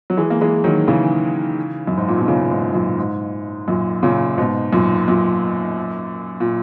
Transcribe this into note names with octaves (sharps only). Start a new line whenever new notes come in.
F#3
E3 G#3
A#3
E3 G#3
D#3 F#3
C#3 E3
F#2
G#2
A#2
B2
A#2 C#3
G#2
F#2 A#2
G#2
F#2 A#2
A#2 C#3
G#2 B2
F#2 A#2
F#2 A#2
A#2